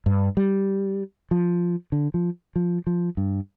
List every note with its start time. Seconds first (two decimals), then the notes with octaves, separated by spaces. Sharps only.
0.06 G2
0.37 G3
1.31 F3
1.92 D3
2.14 F3
2.56 F3
2.87 F3
3.17 G2